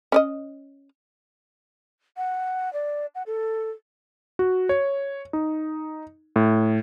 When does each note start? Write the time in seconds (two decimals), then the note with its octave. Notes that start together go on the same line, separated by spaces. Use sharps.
0.12 C#4 D5 D#5
2.17 F#5
2.73 D5
3.15 F#5
3.26 A4
4.39 F#4
4.69 C#5
5.33 D#4
6.36 A2